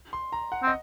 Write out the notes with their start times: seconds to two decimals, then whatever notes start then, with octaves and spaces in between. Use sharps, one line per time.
0.13 C6
0.32 A#5
0.52 F#5
0.63 C4
0.67 D#5